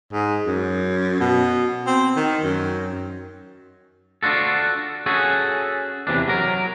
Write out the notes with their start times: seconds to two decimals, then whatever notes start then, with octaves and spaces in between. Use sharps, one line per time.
0.13 G#2
0.47 F#2
1.20 B2
1.87 C4
2.16 D#3
2.43 F#2
4.23 D4 F4 F#4 A4
5.06 C#4 F#4 G#4 A4
6.07 E2 C3 E3 D4
6.28 F#3 A#4